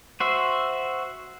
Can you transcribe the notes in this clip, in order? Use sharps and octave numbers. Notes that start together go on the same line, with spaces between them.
F#4 C5 E5